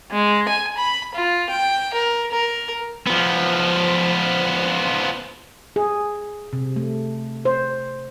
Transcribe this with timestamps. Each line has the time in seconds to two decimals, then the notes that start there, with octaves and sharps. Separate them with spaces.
0.12 G#3
0.48 G#5
0.77 B5
1.15 F4
1.50 G5
1.94 A#4
2.31 A#4
3.07 F3 B3
5.76 G#4
6.53 C3
6.76 A3
7.45 C5